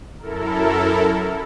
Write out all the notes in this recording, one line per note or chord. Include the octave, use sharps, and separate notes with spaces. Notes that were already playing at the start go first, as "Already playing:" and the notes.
F#2 E4 A4 A#4